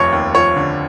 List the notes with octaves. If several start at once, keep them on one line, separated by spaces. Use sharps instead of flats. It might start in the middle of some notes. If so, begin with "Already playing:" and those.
Already playing: F1 D#2 F3 C#5
D#2
F3 C#5
D3